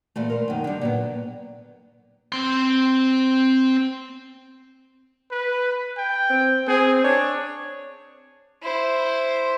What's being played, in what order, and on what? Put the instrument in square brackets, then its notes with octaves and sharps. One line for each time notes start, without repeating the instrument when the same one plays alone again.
[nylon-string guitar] A#2 E3 A3
A#4 C5
F#2 D#3
D3 G3
A#2 F#3 B3
[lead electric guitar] C4 C6
[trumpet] B4
G5
[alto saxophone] C4
[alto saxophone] C4 [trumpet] G#4
[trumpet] D4 [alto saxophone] C#5
[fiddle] E4 C5